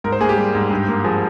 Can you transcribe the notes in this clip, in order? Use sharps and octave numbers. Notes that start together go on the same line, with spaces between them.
G#2 A#4
C5
A#3 G#4
G4
G3
G#2
G2
A#3
F3 G#4